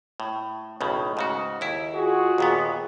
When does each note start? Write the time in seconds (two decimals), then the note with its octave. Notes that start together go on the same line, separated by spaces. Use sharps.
0.20 A2
0.81 B1 A2 C#3
1.17 G#2 C#3 F#4
1.61 D#2 E4
1.94 F4 F#4 G#4
2.38 D#2 A#2 B3